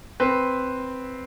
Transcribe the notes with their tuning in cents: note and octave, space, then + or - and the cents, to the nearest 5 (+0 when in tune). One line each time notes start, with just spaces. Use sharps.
C4 +0 B4 +0